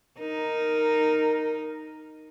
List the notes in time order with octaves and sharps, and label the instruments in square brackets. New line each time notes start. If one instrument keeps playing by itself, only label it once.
[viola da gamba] D#4 [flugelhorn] A#4